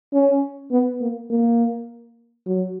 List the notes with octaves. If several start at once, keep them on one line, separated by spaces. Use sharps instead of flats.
C#4
B3
A#3
A#3
F#3